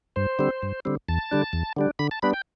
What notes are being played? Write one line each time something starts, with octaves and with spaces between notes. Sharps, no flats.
G2 C5
D3 G3 C4
G2
D3 G3 C4
E2 A5
D3 G3 D4
E2
D3 G3 D4
D3 B5
A5
G3 B3 D4 B5
G5